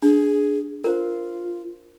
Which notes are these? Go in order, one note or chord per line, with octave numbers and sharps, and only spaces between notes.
D4 G#4
F4 A#4 C5